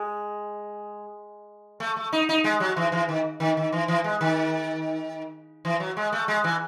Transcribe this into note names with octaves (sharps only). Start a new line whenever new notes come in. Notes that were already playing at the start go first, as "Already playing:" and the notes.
Already playing: G#3
A3
A3
D#4
D#4
G#3
F#3
E3
E3
D#3
D#3
D#3
E3
E3
G#3
D#3
E3
F#3
G#3
A3
G#3
E3